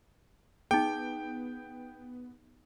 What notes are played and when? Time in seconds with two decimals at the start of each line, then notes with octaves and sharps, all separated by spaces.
0.71 B3 D#4 G#4 G5